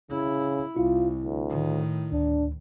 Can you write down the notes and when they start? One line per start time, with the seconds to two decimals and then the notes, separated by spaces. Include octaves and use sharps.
0.11 C#3 E4
0.77 C2 E4 F4
1.20 D2
1.49 A2 D#3
2.12 D2 D4